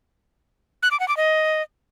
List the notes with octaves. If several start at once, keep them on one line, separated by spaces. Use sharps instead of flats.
F#6
D6
F#5
D6
D#5